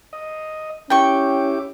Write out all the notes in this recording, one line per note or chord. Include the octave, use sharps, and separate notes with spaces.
D#5
C#4 E4 G4 G5 C#6 D6